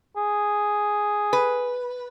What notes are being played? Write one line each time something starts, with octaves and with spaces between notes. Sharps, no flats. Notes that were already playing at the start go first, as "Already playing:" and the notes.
G#4
B4